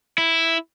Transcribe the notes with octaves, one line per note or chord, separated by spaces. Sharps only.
E4